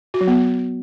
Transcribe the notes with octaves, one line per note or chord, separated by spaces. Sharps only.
F#4
F#3
B3